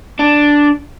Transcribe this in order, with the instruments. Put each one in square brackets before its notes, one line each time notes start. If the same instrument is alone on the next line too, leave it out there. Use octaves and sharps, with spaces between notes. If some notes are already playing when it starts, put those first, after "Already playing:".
[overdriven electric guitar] D4